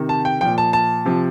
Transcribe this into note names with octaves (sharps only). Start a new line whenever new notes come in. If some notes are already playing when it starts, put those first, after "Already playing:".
Already playing: C3 D#3
A5
G5
A#2 F3 G5
A5
A5
C3 F3